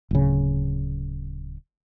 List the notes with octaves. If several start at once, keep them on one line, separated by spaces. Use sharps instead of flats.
D1 C#3